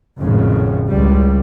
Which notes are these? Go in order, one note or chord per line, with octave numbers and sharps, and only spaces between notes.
G#1 F2 A2 C#3
C#2 G3